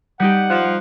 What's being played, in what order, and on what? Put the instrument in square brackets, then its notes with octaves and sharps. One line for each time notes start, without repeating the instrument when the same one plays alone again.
[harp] G3 D#4 G4 [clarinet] F#5
[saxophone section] F3 [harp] F#6